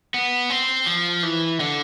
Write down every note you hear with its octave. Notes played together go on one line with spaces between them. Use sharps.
B3
C4
F3
E3
D3